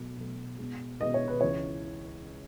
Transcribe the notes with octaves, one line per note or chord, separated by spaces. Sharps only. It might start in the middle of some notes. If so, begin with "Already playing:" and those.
Already playing: B2 F#3 A3
B2 F#3 A3
B2 G#3 B3
B2 G#3 B3 D#5
C#5
B4
C#2 C#3 E3 C#5